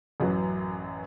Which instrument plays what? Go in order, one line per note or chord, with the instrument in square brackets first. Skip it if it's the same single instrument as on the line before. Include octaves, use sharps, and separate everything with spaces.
[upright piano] A1 F#2 F#3 B4